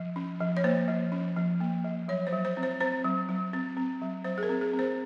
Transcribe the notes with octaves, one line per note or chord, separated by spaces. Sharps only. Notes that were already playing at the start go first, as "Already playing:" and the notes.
Already playing: F3
C#4
F3
C#5
A#3 C5
F3
C#4
F3
A#3
F3
F#3 C#5
C5
F#3
C5
C4
C5
C4 C5
F#3
F#3
C4
C4
F#3
F#3 C5
G#4
A#4
C4
G#4
C4
C5